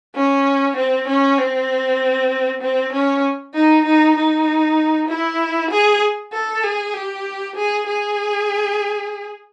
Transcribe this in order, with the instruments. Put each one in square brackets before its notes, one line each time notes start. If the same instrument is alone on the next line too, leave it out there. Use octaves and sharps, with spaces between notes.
[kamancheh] C#4
C4
C#4
C4
C4
C#4
D#4
D#4
D#4
E4
G#4
A4
G#4
G4
G#4
G#4